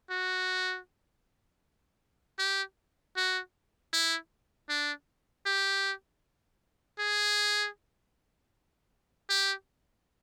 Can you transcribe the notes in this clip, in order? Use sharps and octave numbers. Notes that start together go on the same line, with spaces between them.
F#4
G4
F#4
E4
D4
G4
G#4
G4